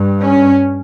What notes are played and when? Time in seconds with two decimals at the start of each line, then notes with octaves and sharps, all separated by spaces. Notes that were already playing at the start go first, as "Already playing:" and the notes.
Already playing: G2
0.24 C#4